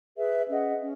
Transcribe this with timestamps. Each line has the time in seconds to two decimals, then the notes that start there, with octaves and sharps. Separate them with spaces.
0.16 G#4 B4 E5
0.48 C#4 G#4 D#5 F#5
0.80 C#4